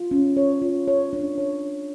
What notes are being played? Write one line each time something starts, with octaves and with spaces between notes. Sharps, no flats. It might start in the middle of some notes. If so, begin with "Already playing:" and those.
Already playing: F4
C#4
C#5
F4
C#5
D4
C#5